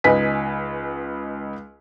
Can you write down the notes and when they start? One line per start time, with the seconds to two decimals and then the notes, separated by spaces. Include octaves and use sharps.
0.04 C#2 D#4 B4 G#5 B6